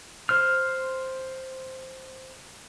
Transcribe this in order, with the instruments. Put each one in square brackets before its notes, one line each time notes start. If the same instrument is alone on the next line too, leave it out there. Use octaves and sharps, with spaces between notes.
[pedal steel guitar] C5 F6